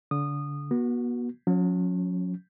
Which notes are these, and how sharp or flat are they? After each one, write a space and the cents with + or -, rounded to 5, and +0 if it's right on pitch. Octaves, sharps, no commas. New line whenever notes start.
D3 -30 D#6 -20
B3 -40 F#4 +0
F#3 -45 C#4 +0